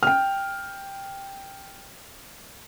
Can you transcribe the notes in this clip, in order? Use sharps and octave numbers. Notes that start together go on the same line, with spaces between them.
G5 F6